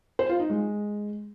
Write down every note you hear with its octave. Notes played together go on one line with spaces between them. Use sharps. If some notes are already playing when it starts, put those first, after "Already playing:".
C5
F4
D#4
G#3